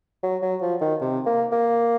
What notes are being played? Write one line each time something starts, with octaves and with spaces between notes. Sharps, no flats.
F#3
F#3
F3
D#3
C3
A#3
A#3